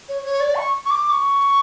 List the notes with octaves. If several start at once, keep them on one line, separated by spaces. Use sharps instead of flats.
C#5
C#5
D5
C#6
C#6
D6
C#6